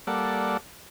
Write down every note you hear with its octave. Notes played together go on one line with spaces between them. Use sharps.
G3 A#3 A4 D5 F#5